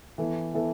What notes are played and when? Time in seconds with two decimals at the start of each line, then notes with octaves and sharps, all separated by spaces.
0.18 E3 B3 A4
0.54 E3 B3 A4